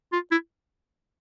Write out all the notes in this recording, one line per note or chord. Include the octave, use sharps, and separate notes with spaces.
F4
E4